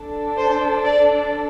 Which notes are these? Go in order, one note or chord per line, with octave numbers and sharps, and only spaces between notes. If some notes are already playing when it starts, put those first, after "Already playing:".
Already playing: D4 A4
C5
D5